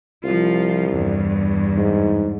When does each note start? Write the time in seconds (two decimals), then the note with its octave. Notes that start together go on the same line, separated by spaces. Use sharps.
0.24 C2 F3 F4
0.89 E2 G2
1.77 G#2